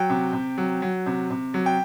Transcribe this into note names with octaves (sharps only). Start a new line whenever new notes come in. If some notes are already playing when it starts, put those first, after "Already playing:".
Already playing: F#3 G5
C3
C3
F#3
F#3
C3
C3
F#3
G5